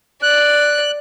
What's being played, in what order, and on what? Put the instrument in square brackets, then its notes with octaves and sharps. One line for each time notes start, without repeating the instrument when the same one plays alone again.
[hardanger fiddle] D5 [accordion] F#6